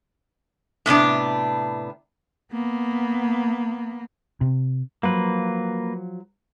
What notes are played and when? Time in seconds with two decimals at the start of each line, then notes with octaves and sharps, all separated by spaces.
0.86 A2 C3 B3 D4
2.52 A#3 B3
4.41 C3
5.03 F3 F#3 A#3 B4